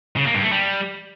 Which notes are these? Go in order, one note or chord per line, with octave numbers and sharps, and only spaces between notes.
C#3
A#3
G2
A3
G3